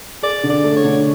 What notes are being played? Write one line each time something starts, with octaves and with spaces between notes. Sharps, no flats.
G#4 D5
D3
D5
A3
C#5
D3